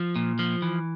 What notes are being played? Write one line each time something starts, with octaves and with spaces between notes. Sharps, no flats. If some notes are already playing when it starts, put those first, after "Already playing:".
Already playing: F3
A#2
F3
E3